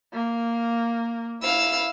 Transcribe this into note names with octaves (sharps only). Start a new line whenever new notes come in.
A#3
E4 F5 E6